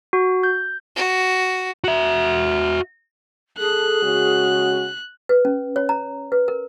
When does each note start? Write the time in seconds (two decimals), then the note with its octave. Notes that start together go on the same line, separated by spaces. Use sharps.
0.13 F#4
0.43 G6
0.96 F#4
1.84 F#4 E5
3.59 G#4 A4 F#6
4.02 C#3 G#3 F#4
5.29 B4
5.45 C#4
5.76 C#5
5.89 A#5
6.32 B4
6.48 A#4